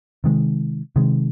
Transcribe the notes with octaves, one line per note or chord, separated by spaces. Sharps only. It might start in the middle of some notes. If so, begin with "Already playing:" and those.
C3 D#3 G#3
C3 D#3 G#3